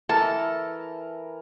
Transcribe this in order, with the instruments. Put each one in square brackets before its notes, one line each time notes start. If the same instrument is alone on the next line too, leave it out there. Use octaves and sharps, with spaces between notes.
[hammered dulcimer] E3 A#4 A#5 [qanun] A4 [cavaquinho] A5